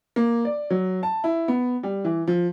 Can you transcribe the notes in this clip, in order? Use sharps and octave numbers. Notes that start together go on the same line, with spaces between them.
A#3
D5
F#3
A5
E4
B3
G3
E3
F3